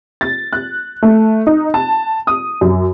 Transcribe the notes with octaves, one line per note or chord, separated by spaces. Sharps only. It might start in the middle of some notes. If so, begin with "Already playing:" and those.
A6
F#6
A3
D#4
A5
D#6
F#2